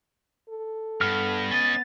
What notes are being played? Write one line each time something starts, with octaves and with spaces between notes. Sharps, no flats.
A4
G2 B3 F6
C#4 D#5 A6